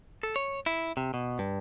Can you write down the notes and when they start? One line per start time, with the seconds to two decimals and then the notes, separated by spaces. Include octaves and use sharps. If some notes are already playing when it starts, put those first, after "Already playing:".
0.23 A4
0.36 C#5
0.66 E4
0.97 C3
1.14 B2
1.39 G2